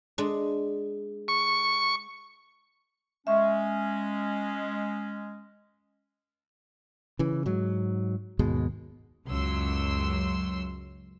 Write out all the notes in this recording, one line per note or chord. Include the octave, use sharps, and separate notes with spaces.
G#3 D4
C#6
G#3 C#4 E5 C#6
C#3 E3
G#2 F#3
D#2 G#2 B2 G#3
C#2 F#2 F#3 C6 E6